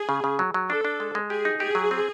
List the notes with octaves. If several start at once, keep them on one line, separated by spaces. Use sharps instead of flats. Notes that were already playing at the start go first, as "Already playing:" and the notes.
Already playing: G#4
C#3
C#3
F#3
F#3
D4 A4
D4
G#3
G#3
G4 G#4
D#4
G4 G#4
F#3
C4